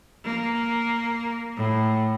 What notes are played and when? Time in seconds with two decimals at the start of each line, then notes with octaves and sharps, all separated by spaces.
0.25 A#3
1.57 A2